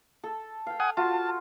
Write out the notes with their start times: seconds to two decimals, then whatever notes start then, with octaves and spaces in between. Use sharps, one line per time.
0.24 A4
0.67 F5 G5
0.80 F#5 G#5 D#6
0.97 F4 F#4 A5